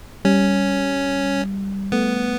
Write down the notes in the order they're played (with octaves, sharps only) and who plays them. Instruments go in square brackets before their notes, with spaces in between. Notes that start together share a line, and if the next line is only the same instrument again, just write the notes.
[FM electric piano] G3 [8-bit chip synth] C#4
[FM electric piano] A3 [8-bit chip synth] B3